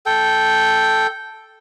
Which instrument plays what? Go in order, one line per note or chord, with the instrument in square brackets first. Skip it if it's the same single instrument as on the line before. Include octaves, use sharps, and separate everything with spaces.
[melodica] A4 G5